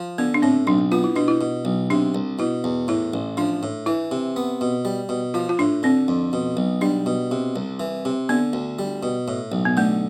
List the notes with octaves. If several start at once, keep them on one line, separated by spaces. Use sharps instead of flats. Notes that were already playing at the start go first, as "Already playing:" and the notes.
Already playing: F3
D3 B3
D4
A2 C4
B1 D4
B3 F4
E4
B2 D4
E4
B2
B1
C3 D4
C2
B2 E4
E2
A2 E4
A1
F3 D4
A2
E3 E4
C3
B3
B2
G3
B2
F3 F4
F4
A2 D4
D3 C4
F2
B2
B1
G3 D4
B2
C3
C2
E3
C3
D3 B3
D2
G3
B2
A2
B1
B3
D3 A3